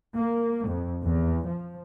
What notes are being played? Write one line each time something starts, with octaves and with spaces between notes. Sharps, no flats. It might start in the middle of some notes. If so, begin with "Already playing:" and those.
A#3
F2
E2
F3